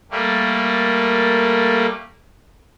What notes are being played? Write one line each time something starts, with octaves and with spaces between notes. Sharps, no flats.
G3 A3 A#3